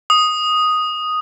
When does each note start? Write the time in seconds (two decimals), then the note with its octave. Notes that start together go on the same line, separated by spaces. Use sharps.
0.10 D#6